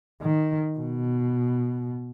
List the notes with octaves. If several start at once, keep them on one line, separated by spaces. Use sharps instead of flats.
D#3
B2